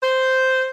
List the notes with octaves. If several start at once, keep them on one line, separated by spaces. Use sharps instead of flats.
C5